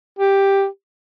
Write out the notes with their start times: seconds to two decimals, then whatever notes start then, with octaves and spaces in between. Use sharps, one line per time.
0.19 G4